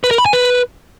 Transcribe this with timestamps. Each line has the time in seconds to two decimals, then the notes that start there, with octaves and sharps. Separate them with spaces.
0.04 B4
0.11 A#4
0.18 B5
0.26 G#5
0.33 B4